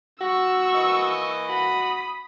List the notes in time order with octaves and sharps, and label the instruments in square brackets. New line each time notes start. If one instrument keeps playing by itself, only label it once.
[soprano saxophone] F#4 [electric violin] C#6 E6
[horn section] E3 A#3 D#5
[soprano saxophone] F#4 [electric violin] B5 D#6